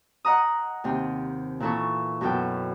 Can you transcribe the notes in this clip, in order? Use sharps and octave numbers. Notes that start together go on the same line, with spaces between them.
D#5 F#5 A#5 D#6
D#2 C3
A#2 E3 E4 A4 C#6
F#2 B2 A4 B4 G5